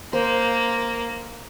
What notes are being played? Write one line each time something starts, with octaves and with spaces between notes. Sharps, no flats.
A#3 C5